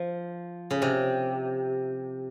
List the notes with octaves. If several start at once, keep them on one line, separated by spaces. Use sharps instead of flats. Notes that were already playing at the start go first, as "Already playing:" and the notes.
Already playing: F3
C#3
C3